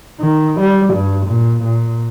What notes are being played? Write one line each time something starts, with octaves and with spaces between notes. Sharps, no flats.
D#3
G3
G2
A#2
A#2